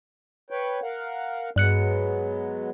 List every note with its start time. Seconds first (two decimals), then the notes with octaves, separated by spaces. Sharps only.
0.50 B4 C#5 G5
0.82 A#4 F5 F#5
1.56 G2 F#3 G#3 B3 F#6 C#7